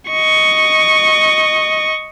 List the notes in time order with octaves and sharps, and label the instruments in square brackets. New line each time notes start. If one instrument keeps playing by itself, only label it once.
[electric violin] D#5 C#6